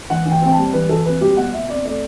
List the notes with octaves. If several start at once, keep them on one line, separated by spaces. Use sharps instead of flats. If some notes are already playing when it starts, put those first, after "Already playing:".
E3 F#5
E3
G5
C4
G5
A5
G3
E3 B4
E3 A4
C4 B4
G3 G4
B2 F#5
B2 E5
C4 D5
A3 D5